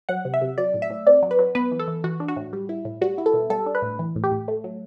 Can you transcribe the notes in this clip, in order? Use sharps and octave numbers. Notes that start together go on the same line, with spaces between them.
F#3 F#5
C3
E5
C3
F#3 D5
A2
E5
A2
C4 D5
F#3
B4
F#3
B3 B4
E3
A4
E3
E3 F#4
D4
F#4
A2
G3
E4
A2
G3 F#4
E4
A4
B2
G3 A4
D4
B4
A2
E3
A2
G4
A2
A3
F#3